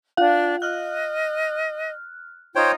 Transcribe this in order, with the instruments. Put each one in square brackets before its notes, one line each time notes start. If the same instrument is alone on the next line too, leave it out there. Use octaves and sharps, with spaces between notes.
[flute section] D4 [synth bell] F4 F5
[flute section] D#5 [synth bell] F6 F#6
[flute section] D#4 F4 [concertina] C5 C#5 G5